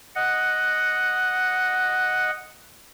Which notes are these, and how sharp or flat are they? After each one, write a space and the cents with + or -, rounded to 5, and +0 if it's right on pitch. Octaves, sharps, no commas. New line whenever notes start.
D#5 +0 F#5 +0